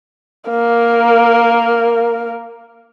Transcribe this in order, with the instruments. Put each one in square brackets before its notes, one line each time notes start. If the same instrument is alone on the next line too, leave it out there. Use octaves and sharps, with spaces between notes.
[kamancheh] A#3 A#4